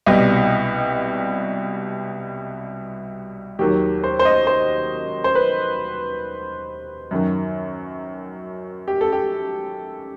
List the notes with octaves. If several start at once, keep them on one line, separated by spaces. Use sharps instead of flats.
C2 B2 G3 D#5
D#2 D#3 F#3 G4
C5
C5
D#5
C5
C5
B4
F#2 D#3 F#3
G4
A4
G4